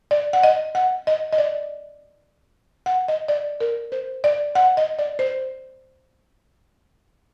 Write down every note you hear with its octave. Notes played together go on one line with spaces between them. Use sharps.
D5
F#5
D#5
F#5
D#5
D#5
D5
F#5
D#5
D5
A#4
C5
D5
F#5
D#5
D5
C5